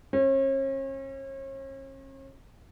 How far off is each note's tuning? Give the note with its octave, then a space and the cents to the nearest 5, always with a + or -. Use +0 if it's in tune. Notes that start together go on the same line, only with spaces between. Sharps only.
C#4 -40